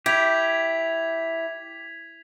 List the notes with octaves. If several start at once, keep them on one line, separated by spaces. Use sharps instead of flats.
E4 G4 G#6 B6 F7